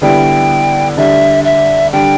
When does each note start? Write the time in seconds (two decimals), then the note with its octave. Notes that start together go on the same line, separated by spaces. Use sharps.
0.02 D3 G3 B3 E4 G5
0.97 D3 G3 D4 E5
1.45 E5
1.93 D3 G3 D4 G5